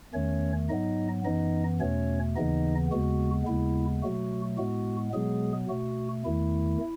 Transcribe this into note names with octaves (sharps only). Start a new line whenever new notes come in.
E2 D#3 A3 C#4 C#5
G#2 F#3 B3 D#4 D#5
F#2 E3 B3 D#4 D#5
E2 B2 A3 C#4 C#5
D#2 C#3 E3 B3 D#4 D#5
D#2 C#3 G#3 B3 F#4
D#2 C#3 G#3 B3 E4
B2 F#3 A3 F#4
A2 G#3 B3 F#4
B2 F#3 G#3 B3 G#4
B2 A3 F#4
E2 D#3 A3 E4